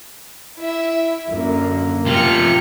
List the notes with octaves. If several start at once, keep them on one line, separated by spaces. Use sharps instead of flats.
E4 E5
F#2 D3 A#3
C3 F4 G5 F6 C#7